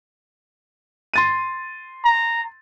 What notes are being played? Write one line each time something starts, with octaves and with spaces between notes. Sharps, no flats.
C6 A6 D#7
A#5